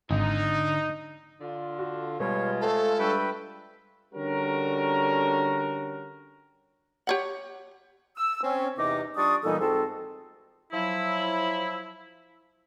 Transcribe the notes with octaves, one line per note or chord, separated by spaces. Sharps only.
G#1 D3 D#4
D3 F4
F#4
B2 G3 G#3 B3 F4 C#5
A3 A4 C5 F5 A5
G3 D4 B4 E5 G5 C#6
D3 G3 C#4 F#4 A#4
G4 C#5 F#5
E6
C4 C#4
E2 C3 D#4 D#5 D6
G3 D4 F4 D5 C#6 D#6
A#2 E3 G3 B3 D#4 A4
G#2 C4 F4 F#4 A4
F3 F#3 E4